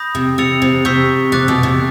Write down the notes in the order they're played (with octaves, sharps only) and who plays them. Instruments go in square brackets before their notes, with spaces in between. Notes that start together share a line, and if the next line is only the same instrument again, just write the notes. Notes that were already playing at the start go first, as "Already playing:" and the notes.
Already playing: [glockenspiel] B5 D#6 G6 A#6
[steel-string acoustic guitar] C3
[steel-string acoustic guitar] C3 [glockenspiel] E6 A6 C#7 F7
[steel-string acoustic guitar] C3
[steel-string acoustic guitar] C3 [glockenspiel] C#6 E6 G6 B6
[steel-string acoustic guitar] C3 [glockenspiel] D6 F#6 A6
[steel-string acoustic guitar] B2
C3